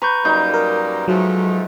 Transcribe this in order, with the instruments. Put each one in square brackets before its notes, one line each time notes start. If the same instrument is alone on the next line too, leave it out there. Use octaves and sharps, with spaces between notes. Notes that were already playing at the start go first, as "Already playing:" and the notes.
[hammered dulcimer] B4 [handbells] A#5 C#6 G6
[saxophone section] F#2 G3 A#3 [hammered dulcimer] D#4 [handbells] G6
[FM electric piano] A#4
[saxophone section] G#2 F3 A3 [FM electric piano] F#3